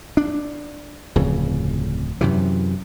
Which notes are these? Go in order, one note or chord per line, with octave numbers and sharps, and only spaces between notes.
D4
D1 F2 C#3
F#2 C3 E3